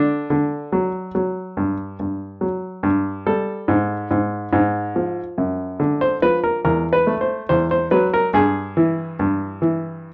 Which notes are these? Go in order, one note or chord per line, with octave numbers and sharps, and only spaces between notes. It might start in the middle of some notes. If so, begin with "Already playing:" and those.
Already playing: D3 D4
D3
F#3
F#3
G2
G2
F#3
G2
G3 A4
G#2
G#2
G#2
F3
F#2
D3
C5
F3 B4
A#4
E2 A#4
B4
A3
C5
E2 C5
C5
F#3 B4
A#4
G2 G#4
E3
G2
E3